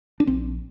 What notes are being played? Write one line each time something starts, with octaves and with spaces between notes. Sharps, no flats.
D4
A#1 C4